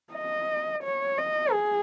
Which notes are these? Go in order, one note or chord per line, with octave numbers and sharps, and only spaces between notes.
D#5
C#5
D#5
G#4